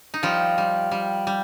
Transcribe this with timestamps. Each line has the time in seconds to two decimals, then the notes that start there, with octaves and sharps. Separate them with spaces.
0.14 D#4
0.23 F3 G3 F4
0.58 G3
0.91 G3
1.27 G3